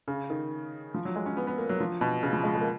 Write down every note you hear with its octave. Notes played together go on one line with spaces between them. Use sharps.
C#3
D#3
F3
F#3
G#3
C#4
B3
B3
A#3
F#3
F3
B2
C#3
F3
G#3
G#3
A#3